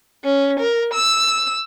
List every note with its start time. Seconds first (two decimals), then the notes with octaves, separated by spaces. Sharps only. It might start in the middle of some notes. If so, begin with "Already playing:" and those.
0.25 C#4
0.60 A#4
0.94 E6